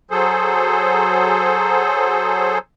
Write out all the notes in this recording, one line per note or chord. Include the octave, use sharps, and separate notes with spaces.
F#3 G#4 A4 C5